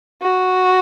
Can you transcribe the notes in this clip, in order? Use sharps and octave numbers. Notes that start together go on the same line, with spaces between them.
F#4